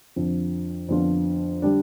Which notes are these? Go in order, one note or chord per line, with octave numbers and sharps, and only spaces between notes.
F2 D3 F3 C4
F2 D3 F3 B3 F4
D3 G3 D4